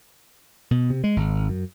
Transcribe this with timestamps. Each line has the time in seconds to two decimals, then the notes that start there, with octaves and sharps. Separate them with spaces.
0.71 B2
0.90 C3
1.04 G#3
1.16 G#1
1.49 F#2